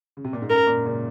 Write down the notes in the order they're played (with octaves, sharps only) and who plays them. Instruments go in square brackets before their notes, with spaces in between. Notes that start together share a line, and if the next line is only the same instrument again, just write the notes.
[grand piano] C#3
C3
A#2
G#2
[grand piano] F#2 [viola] A#4
[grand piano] F#2 A#2
A#2 C#3